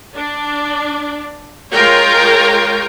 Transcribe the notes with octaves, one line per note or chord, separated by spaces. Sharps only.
D4
G#3 F4 A#4 C#5 G5